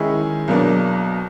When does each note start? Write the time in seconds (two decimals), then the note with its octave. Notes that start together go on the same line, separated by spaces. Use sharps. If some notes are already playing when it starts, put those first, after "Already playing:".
Already playing: D#3 G#3 C#4 E4 G#4
0.48 B1 B2 F#3 A#3 D4